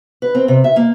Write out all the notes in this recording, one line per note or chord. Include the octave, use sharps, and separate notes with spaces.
B4
C4
C3
E5
A#3